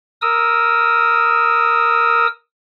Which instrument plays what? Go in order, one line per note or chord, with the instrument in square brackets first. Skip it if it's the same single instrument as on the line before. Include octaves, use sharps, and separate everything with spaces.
[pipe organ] A#4 D#6 E6